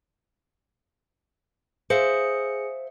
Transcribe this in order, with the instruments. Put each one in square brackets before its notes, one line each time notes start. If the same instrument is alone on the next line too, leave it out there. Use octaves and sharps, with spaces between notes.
[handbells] G#4 C#7 [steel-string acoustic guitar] C5 E5 F5